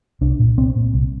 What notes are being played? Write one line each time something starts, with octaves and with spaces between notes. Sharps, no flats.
C2 D4
A#2
C2 C4
A#2
C2